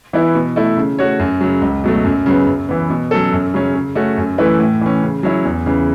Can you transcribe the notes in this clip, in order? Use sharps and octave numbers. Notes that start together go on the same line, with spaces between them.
E3 B3 E4
B2
A3 E4
C#3
A3 F#4 C#5
F#2
C#3 F#3
C#2
B2 F#3 A3
F#2
C#3 F#3 B3
F#2
E3 B3
B2
F#3 C#4 A4
F#2
C#3 F#3 C#4
C#3
A3 C#4 F#4
F#2
E3 A3 E4 B4
A2
E3 C#4
C#3
F#3 C#4 E4
E2
C#3 E3